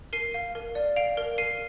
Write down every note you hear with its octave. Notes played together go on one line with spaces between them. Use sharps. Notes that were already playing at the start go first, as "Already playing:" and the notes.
A#4 C7 D#7
F5
A#4
D5
F5 D7 F7
A#4
A#4 C7 D#7